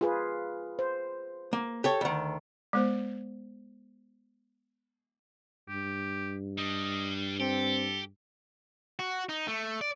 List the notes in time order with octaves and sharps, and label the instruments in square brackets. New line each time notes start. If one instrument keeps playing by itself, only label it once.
[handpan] F4 G#4 B4
C5
[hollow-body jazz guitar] A#3
G4 A4 C#5
D2 D#3
[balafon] G#3 B3 C5
[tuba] G2 [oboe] G4
[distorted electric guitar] G3 D4 [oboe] D#5
[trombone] C4 [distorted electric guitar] G4 [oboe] A4
[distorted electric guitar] F#4
D#4
A3
D5